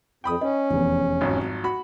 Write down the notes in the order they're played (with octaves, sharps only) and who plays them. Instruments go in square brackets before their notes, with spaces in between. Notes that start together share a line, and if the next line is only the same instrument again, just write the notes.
[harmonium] F2 [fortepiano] G5 B5 D#6
[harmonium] C#4 [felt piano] D#5
[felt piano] F1 E2
[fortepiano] G#1 F2 F#3
F#4 B5